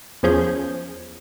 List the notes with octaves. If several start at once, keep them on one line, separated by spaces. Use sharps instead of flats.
E2 F3 C#4 G#4 G6